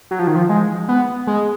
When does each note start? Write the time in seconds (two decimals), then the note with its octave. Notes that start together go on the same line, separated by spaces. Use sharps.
0.11 F#3
0.19 F3
0.27 D#3
0.36 F3
0.49 G#3
0.88 B3
1.27 G#3